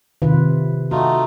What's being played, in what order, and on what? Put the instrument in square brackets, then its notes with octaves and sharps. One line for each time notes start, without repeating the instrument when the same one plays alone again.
[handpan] C3 F4 B4 [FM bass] D#3
[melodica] A3 D#4 F4 [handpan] F#4